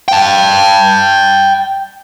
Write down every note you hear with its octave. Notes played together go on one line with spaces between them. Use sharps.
G5 A5